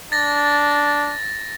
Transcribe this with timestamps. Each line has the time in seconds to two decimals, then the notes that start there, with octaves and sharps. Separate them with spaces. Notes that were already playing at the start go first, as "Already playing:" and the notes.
0.12 D4 A6 A#6